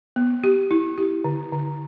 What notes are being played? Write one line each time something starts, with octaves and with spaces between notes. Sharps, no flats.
B3
G4
E4
G4
D3
D3